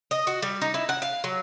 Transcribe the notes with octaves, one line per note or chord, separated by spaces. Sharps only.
D#5
F#4
G3
D#4
E4
F#5
F5
F#3